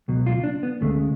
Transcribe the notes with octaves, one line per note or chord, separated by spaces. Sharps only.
C#2 B2 F#3
F4
D4
B3
D2 C#3 G#3 A3